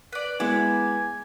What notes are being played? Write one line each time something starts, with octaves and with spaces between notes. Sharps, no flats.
B4 D5
G#3 B3 E4 G#5 D6